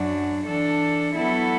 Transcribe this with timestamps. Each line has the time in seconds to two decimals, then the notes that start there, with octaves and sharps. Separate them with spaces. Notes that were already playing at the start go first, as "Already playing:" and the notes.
Already playing: F#2 F#3 D4
0.46 E3 D4 A4
1.14 F#3 B3 E4 A4